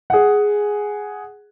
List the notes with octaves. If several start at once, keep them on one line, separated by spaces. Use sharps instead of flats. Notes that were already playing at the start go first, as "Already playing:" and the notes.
G#4 F#5